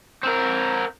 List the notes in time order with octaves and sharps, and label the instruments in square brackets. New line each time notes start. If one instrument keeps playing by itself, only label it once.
[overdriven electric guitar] C4 A#4